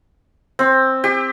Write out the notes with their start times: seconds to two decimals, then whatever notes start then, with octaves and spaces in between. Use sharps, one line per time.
0.59 C4
1.04 G4